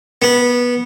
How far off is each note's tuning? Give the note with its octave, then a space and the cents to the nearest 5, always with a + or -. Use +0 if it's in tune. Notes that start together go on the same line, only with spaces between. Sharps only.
B3 -15